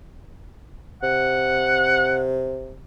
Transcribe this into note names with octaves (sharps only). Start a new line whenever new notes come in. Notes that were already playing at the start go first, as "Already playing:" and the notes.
C3 F#5